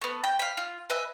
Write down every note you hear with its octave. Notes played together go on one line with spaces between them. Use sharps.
A3 B3
G5
F5 B5
F4
B4 D#5 E5 G#5